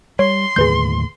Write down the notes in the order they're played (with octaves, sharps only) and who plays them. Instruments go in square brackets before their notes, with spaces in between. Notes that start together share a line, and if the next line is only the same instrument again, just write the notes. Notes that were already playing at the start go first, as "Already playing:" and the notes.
[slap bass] G3 [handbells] C#5 [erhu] C6
[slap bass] D#2 A2 D3 [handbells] G#4 B4 G6